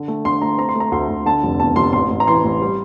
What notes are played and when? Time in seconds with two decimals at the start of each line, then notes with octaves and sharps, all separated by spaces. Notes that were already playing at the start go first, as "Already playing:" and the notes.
Already playing: D3
0.08 A3
0.25 D3 C6
0.42 A3 A#5
0.58 C4 A#5
0.69 C6
0.76 A3 A#5
0.92 D2 C6
1.08 D2
1.26 D3 A5
1.43 F1
1.60 E2 A5
1.76 F1 C6
1.93 A1 C6
2.10 A1
2.20 A#5
2.27 E3 C6
2.44 A1
2.62 G3